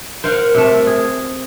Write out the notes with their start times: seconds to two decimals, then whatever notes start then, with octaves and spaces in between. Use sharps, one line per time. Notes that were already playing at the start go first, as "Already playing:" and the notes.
0.24 A#4 C5 F5 F#5
0.55 C3 A3
0.87 G#4